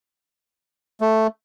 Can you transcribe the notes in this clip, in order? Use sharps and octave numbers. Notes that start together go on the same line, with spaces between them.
A3